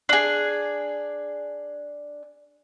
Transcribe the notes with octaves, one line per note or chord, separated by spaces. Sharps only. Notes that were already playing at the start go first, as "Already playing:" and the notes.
D4 G#4